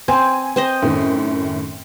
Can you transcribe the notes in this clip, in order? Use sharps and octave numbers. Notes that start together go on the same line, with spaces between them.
C4 G#5
C4 C5 D#5
F#2 A2 D#3